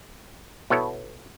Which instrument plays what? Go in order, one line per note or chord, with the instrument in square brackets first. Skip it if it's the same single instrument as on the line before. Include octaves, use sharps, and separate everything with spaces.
[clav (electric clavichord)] B2 B3 E4 A4 C#5